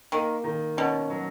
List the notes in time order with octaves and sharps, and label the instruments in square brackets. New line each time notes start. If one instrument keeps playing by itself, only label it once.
[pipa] D#3 [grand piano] A#3
[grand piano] D#3
[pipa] B2 [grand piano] C#4
[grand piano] F#3